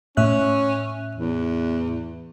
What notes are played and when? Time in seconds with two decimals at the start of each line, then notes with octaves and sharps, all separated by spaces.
0.17 A2 C#4 E5 F#6
1.15 E2